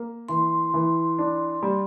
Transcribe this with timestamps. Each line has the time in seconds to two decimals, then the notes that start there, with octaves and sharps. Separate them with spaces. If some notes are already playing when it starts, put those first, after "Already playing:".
Already playing: A#3
0.28 E3 C6
0.74 E3
1.19 D4
1.63 G3